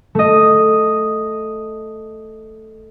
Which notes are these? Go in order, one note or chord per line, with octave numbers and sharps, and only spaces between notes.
A3 D#5